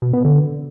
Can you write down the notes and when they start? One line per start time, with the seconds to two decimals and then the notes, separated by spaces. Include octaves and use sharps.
0.02 B2
0.13 B3
0.25 D3